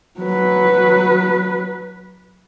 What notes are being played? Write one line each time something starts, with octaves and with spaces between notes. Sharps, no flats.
F#3 B4